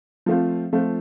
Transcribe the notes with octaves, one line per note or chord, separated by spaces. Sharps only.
F3 A3 C4 F4
F3 A3 C4 F4